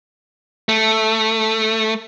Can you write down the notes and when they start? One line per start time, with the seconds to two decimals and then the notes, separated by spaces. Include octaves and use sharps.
0.69 A3